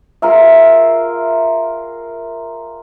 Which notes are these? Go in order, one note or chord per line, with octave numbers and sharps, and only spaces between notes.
F4 G#4 A#4 E5